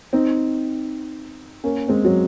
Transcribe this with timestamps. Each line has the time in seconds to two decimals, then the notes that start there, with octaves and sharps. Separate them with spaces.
0.13 C4 D#4
1.64 A#3 C#4
1.88 G#3 C4
2.05 F#3